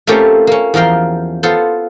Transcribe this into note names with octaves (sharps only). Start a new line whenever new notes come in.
A3 A#3 C4 C#4 F4 G4
A#3 C#4
E2 F3 A#4 F5 G5
B3 F4 A4 C5